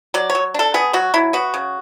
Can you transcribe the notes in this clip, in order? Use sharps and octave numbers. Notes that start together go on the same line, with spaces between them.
F#3 D5
C#5
F#3
D4 A4
B3 G#4
F#3 F#4
F#3 E4
B3 F#4
C#3